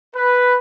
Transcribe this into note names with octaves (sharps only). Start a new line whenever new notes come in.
B4